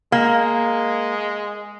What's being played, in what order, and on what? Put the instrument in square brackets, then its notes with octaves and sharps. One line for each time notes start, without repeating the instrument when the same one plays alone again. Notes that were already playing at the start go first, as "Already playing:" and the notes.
[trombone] G#3 [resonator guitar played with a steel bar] A#3